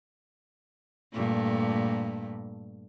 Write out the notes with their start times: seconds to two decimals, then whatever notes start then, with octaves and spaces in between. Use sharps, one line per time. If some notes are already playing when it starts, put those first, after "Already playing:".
1.13 G2 A#2 A3